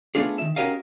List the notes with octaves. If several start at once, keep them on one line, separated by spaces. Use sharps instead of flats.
A3 B3 D4 F4 G#4
D#3 E5
C#4 F#4 G4 A#4 D#5 F5